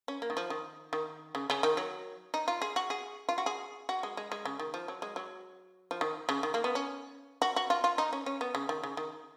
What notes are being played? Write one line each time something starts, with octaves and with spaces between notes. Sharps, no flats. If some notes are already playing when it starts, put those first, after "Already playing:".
C#4
A#3
D#3
F3
D#3
D#3
C#3
C#3
D#3
F#3
D#4
F4
G#4
F#4
G#4
F4
F#4
G#4
F#4
G#3
G#3
G#3
C#3
D#3
F3
F#3
G#3
F#3
F3
D#3
C#3
D#3
A#3
B3
C#4
F#4
F#4
F4
F4
D#4
C#4
C#4
B3
C#3
D#3
C#3
D#3